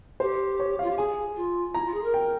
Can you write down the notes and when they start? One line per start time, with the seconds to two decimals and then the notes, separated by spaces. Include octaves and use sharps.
0.20 G4 C5
0.59 C#5
0.79 F5
0.82 F4
0.90 G4
0.97 G#4 G#5
1.36 F4
1.74 E4 A#5
1.85 F4
1.94 G#4
2.04 A#4
2.14 G5